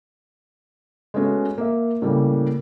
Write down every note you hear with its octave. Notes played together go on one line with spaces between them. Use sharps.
G#3 A3 B3 C#4 F#4 A4
A#3 E5
A2 C#3 G3 A#3